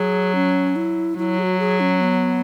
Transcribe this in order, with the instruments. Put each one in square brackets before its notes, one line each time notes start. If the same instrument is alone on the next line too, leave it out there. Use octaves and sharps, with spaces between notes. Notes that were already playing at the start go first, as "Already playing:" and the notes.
Already playing: [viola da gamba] F#3 [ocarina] G#4
[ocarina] C#4
E4
[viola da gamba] F#3 [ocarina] E4
[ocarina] G#4
F#4
G#4
C#4
B3